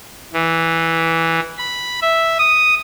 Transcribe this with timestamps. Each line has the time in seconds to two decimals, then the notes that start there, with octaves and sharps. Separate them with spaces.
0.33 E3
1.58 B5
2.02 E5
2.39 D#6